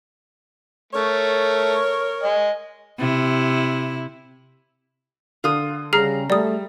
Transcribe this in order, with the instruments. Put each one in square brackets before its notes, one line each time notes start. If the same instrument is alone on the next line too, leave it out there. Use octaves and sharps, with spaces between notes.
[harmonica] A3 [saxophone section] A#4 C#5
[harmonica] D#5 G#5
[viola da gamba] C3 E4
[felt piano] D3 [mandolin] F4 D#6
[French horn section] C#3 G3 [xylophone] G#4 F6 C7 [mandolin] A#5
[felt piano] G3 [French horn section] A3 [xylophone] D5 D#6